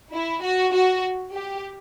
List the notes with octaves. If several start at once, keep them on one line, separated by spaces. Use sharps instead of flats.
E4
F#4
F#4
G4